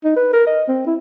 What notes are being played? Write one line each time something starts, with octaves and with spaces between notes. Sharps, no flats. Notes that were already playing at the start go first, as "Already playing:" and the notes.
D#4
B4
A#4
D#5
C4
E4